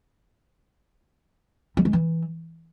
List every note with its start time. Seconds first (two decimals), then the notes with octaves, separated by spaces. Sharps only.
1.77 G3
1.85 G#3
1.93 E3